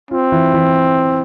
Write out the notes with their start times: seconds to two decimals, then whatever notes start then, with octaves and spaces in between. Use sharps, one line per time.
0.11 C4 F4
0.32 E3
0.54 E3